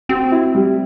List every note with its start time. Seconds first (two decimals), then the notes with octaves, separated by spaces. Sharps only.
0.09 C4 F#4
0.32 E4
0.55 G3